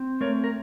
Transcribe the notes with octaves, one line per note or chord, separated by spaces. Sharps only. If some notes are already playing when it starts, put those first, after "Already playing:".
Already playing: C4
A3 A#4 C#5
A#4